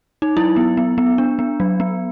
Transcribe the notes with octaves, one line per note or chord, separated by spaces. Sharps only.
D#4
F#3 E4
B3
B3
B3
D4
B3
F#3
B3